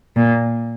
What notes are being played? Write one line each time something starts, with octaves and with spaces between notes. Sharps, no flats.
A#2